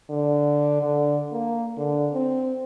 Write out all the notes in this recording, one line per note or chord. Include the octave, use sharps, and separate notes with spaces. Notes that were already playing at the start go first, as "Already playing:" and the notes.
D3
D3
A#3
D3
C4